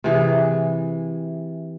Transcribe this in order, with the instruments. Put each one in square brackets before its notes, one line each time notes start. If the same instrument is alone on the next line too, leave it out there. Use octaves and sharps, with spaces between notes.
[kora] C3 E3 G#4